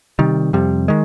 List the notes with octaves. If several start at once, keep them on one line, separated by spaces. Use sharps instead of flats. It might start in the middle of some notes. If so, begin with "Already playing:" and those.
C3 D#3 G3
F2 C3 G3
D#3 G#3